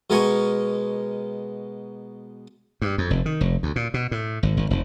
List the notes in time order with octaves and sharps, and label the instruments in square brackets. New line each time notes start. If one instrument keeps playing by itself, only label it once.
[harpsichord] B2 G#3 A#4 D#5 G#5 C#6
[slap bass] G2
F2
F1
D#3
F1
D2
A#2
B2
A2
G#1
G#1
F1